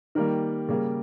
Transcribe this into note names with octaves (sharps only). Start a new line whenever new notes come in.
D#3 G3 A#3 A#4
C#3 G3 A#3